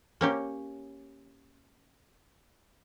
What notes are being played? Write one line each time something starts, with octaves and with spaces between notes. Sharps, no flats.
A#3 C#4 G4